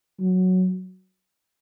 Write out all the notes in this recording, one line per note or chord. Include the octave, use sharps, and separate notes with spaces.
F#3